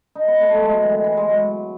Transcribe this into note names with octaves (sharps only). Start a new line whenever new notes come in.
D#4
B3
A3
A3
G#3
F#3
E3
D#3
E3
G#3
F#3